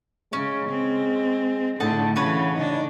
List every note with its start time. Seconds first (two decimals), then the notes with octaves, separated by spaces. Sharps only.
0.33 C#3 G#3 C#4
0.70 C4
1.80 A2 D3 D#4 A4 F#5 A5
2.16 C#3 E3 F#4 B4 C#5
2.57 D4 D#4